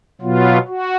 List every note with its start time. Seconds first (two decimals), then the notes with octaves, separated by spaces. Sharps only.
0.21 B2 F#3 B3 F4
0.68 F#4